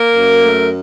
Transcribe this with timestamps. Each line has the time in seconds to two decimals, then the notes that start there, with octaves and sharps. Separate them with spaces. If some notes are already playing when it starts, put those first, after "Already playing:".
Already playing: A#3 A#4
0.13 F#2
0.44 A3